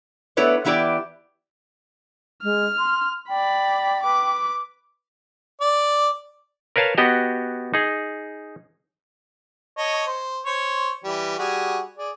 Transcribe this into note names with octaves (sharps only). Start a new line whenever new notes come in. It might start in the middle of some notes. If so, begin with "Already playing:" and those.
A3 B3 E4 B4 C#5 D5
E3 B3 E4 G4 D5
G#3 F6
C6
D5 G5 B5
B4 D6
D5
A#4 B4 C#5 F5 A5
B3 F#4 G4 D#5
D#4 G#4
C#5 D#5 A5
C5
C5 C#5
E3 G3
G3 F#4 G#4
G#4 D5